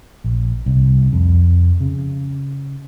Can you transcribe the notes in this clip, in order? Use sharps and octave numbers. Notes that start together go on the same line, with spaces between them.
A#1
C2
F2
C#3